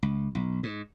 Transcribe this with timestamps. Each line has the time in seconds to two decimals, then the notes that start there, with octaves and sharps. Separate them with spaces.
0.03 C#2
0.35 B1
0.63 G#2